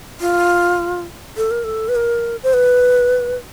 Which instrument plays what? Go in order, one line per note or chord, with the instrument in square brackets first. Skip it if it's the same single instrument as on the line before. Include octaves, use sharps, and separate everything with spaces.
[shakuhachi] F4
A4
A#4
A4
B4
A#4
C5
B4